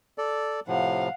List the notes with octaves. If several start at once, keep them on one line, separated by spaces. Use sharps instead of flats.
A4 D5
A2 C3 F3 F5 F#5